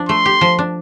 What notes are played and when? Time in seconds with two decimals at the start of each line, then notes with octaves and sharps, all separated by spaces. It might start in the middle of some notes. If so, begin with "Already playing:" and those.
Already playing: F3 D4
0.09 A3 C6
0.26 G4
0.41 F3
0.59 D4